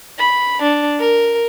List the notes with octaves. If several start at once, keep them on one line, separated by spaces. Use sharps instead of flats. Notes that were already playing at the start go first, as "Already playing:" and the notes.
B5
D4
A#4